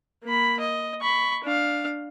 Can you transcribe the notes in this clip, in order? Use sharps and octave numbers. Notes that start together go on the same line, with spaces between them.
A#3 B5
D#5
B5 C#6
D4 F5